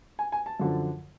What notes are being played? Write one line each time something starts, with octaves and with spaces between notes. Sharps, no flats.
G#5
G#5
A5
F#2 D3 F3